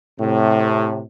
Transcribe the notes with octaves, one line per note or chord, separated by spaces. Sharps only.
A2 C3